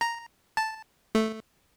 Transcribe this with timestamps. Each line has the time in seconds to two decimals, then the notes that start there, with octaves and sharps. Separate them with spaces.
0.01 A#5
0.57 A5
1.15 A3